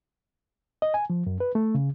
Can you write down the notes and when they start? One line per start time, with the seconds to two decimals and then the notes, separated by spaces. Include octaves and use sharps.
0.82 D#5
0.94 G#5
1.10 F3
1.27 F#2
1.40 B4
1.55 A3
1.75 C#3